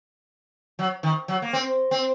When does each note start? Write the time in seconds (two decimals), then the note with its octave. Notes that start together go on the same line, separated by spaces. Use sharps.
0.79 F#3
1.03 D#3
1.28 F#3
1.42 A#3
1.53 C4
1.91 C4